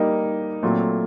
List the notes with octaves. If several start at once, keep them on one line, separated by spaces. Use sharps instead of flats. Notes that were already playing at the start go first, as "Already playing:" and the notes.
Already playing: G3 A#3 D#4
A#2 F#3 A3 C4